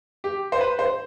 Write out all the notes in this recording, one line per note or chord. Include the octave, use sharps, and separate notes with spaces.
G4
C5
B4
C5